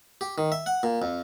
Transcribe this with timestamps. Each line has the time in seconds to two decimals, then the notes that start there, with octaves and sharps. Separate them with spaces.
0.21 G4
0.38 D#3
0.52 E5
0.66 F#5
0.83 A#2
1.02 F2